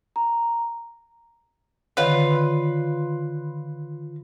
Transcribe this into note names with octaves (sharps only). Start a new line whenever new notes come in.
A#5
D3 D#3 F4 B4 C#5